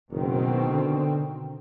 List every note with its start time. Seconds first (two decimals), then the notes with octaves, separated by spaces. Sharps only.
0.11 F#1 B2 D#3 C4
0.69 D3